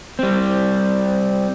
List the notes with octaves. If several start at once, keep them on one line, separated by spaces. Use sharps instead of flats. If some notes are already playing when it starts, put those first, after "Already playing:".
G3 C4